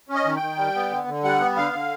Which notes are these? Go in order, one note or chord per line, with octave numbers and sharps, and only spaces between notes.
C#4
D#5
D#3
D#3 G5
G3
B3
D3
D3
G3 F#5
B3
D3 F5
D3